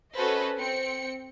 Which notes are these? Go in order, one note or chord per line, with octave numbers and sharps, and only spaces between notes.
C#4 F#4 A4 B4 C5 D#5
C4 G5 C#7